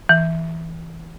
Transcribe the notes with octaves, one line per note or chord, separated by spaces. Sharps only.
E3